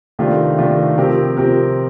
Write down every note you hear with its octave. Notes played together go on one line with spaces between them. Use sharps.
C3 D#3 A3 D4 F4
C3 D#3 A3 D4 F4
C3 F3 C4 G4 A#4
C3 F3 C4 G4 A#4